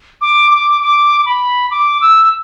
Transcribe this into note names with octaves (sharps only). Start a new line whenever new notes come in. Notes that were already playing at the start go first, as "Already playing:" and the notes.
D6
D6
D6
B5
D6
E6